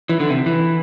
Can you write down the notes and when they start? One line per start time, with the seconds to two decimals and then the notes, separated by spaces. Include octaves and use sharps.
0.09 E3
0.20 D3
0.30 C3
0.46 E3